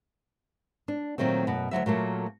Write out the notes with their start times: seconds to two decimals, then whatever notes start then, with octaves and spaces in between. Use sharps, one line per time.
0.88 D4
1.18 A#2 D#3 F#3 A3 C4
1.47 F#2 B2
1.71 D2 G2 F#3 E5
1.86 A#2 F#3 A3 A#3